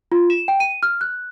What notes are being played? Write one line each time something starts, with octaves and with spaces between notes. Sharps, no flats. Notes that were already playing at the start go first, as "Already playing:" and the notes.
F4
E7
G5
D#7
F6
F#6